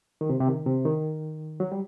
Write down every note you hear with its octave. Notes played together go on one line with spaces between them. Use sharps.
D#3
C3
C3
D#3
C3
D#3
F#3
G3